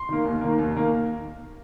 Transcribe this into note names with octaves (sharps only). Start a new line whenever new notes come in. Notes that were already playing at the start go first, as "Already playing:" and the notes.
Already playing: C6
D#3 A#3
D#2
D#3 A#3
D#2
D#3 A#3